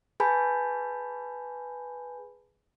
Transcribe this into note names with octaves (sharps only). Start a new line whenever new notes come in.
G#4 B4 G#5 A5 B5 G6